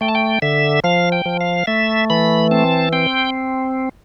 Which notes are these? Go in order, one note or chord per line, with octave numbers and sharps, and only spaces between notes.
A3 G5
A5
G5
D3 E5
F3 F5
G5
F3
F5
A3 E5
E3 B5
C4 A5
C4 G5